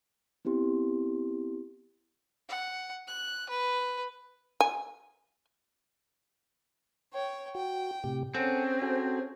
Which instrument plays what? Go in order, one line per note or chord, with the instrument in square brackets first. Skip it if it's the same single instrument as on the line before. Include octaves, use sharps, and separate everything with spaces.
[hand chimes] B3 C4 E4 G4 C6
[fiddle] F#5
F#6
B4
[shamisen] G#5
[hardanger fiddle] C#5 G5
[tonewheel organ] F#4 [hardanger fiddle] G5
[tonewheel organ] A2 C3 G4
[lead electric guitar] C4 [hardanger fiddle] C#4 G#4 [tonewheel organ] A4 F#5 G#5
[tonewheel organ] F#4 A4 C5